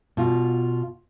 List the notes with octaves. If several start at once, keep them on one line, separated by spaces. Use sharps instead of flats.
B2 F4